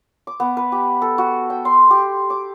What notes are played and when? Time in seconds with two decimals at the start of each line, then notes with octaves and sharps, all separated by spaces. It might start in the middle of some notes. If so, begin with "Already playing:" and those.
0.27 D6
0.40 B3
0.57 B4
0.72 G4
1.02 A4
1.18 F#4
1.50 G5
1.65 C6
1.90 G4
2.30 D6